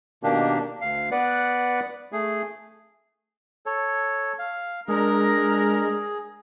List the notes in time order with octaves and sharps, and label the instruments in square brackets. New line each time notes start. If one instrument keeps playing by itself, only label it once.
[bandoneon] B2 D#3 A#3 D4 G4
D2 F5
B3 B4 D5 F#5
A3 G#4
[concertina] A4 C#5
F5
[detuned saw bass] G#3 [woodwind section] D4 A#4 [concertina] G#4